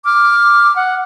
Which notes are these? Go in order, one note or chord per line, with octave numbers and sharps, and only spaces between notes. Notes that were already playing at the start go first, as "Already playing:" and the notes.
D6 F6
F#5